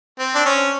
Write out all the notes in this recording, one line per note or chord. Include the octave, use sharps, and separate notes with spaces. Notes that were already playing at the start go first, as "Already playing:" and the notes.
C4
D4
C#4